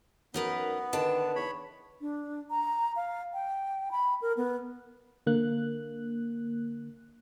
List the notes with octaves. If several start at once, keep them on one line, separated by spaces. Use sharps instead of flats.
F#2 B3 D#4 A#4 B4
D3 D#3 D4 B4 A5
E2 C#5 B5
D4
A#5
F5
G5
B5
A#4
B3
D3 A#3 F#6